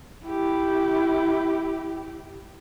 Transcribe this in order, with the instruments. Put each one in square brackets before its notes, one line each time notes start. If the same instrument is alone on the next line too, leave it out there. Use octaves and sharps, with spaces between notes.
[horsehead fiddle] E4 G4